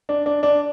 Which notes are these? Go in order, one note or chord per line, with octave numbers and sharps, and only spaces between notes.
D4
D4
D4